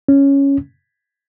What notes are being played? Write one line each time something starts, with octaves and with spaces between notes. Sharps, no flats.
C#4